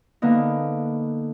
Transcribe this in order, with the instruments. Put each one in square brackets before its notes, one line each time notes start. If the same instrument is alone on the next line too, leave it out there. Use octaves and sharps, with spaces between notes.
[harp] D3 A#3 B3 D#4